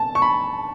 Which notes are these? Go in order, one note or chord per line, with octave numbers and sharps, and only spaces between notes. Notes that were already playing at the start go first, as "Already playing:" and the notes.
Already playing: A5
C#6
B5